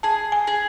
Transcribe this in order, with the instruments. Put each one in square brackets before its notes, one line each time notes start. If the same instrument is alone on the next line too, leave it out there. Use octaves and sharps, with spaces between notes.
[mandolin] G#4 [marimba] A5
[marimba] G#5
[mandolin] G#4